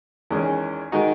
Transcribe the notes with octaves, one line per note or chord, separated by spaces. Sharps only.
E2 D#3 G#3 C#4
D#3 G#3 D#4 F#4